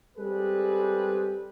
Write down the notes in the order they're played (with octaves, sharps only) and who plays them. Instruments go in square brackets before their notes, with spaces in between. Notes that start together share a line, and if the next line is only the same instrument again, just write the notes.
[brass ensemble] G3 G#3 C4 G#4 A4 B4